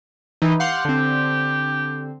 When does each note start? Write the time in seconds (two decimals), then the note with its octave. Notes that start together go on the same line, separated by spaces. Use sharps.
0.42 E3 D#4
0.60 G4 F5 F#5 C6
0.85 D3 C4